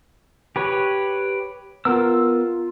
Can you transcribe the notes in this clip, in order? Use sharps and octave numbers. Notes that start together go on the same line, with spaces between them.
G4 B4 C#5
B3 F4 A#4 E6